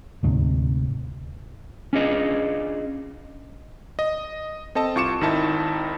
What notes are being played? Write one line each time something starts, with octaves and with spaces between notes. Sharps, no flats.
D2 G#2 C3
C#4 D4 F4 G#4 D#5
D#5
C4 A4 D#5 A5
C2 F4 C#6 D6 C#7 E7
G#1 D#3 D#4 E4 A5